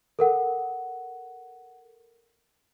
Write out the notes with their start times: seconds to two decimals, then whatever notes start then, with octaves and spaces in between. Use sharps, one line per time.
0.19 A4 A#4 F#5